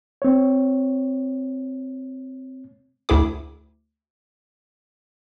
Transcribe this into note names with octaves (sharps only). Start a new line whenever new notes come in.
C4 C#5
D2 E4 G#4 D6